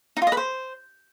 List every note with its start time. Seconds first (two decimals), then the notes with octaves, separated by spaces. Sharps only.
0.17 D#4
0.22 F4
0.27 D#5
0.32 B4
0.37 C5